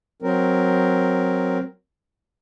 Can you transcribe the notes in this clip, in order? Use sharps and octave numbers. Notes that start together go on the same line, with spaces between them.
F#3 C4 A#4